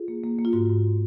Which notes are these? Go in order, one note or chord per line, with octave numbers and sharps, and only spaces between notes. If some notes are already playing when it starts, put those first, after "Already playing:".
Already playing: F4 G#4
A#3
A#3
A#3
F4
G#2 F#4
G#2